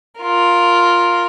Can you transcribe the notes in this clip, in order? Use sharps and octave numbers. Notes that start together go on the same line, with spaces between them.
F4 A#4